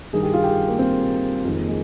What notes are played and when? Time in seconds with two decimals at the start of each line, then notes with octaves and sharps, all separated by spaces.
0.13 G2 D#3 G#4
0.23 G4
0.34 F4
0.44 G4
0.68 A#3
0.79 C4
1.44 F2 D#3 G#3
1.56 A#3
1.68 G#3